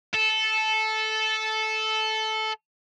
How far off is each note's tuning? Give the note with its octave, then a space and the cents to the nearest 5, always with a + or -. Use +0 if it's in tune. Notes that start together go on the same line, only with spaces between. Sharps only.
A4 -10